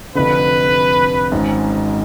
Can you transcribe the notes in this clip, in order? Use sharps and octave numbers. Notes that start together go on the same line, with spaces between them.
F1 F2 D3 B4
G#1 G#2 G#3 C#4